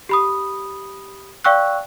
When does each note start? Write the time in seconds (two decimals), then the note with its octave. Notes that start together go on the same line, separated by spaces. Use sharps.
0.09 G4 B5 D#6
1.45 D5 F5 G5 C#6 E6 F#6